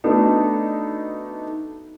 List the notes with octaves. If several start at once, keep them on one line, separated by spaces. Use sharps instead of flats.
A3 B3 D4 D#4 F#4